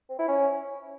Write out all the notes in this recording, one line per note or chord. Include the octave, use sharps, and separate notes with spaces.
C4
E4
C#4